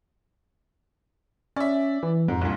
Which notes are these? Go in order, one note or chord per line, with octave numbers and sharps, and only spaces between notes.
C#4 D5 E5
E3
F2 G#2
C2 G2 A#2